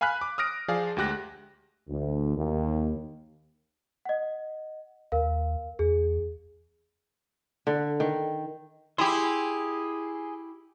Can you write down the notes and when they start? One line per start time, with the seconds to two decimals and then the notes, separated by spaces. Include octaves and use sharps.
0.01 F5 G#5 B5 F6 F#6 B6
0.21 D6
0.38 D#6 F6 A#6 D7
0.68 F3 G#4 D5 F5
0.97 D2 G#3 G4 F#6 A#6
1.88 D2
2.35 D#2
4.05 D#5 F#5
5.12 D#2 A#4 F5
5.79 E2 G#4
7.67 D3
8.00 D#3
8.98 E4 G4 G#4 C6